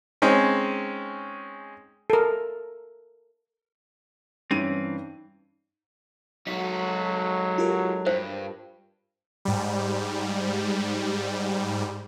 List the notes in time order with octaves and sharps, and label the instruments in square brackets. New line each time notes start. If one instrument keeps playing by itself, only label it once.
[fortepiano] G#3 C4 C#4 D#4
[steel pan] A4 A#4
[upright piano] G2 [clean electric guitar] E3 C4 [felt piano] C#4 D#7 [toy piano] D#4
[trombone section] F#3 G#3 A4 [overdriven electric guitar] D#4 F#4 [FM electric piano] B6
[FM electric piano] F4 G4 A#4
[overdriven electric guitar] G2 [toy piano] C5
[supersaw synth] G#2 G3